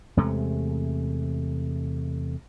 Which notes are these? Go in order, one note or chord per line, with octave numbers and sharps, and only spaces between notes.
E2 C3 G#3 A3